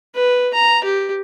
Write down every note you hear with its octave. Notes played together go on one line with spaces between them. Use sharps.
B4
A#5
G4